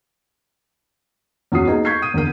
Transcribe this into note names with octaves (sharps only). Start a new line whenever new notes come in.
E2 C#4 F#4 D#6 C7
A#3 B3 D#4 G#4 B4
C#6 G6 G#6 B6 C7
D#6 D#7
E2 D3 A#4 D#7